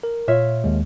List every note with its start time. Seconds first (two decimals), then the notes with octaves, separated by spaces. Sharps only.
0.03 A#4
0.28 A#2 F4 C#5 E5
0.64 D#2 G#3